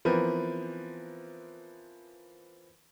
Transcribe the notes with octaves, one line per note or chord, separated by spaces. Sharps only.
E3 F3 B3 C4 A#4 B4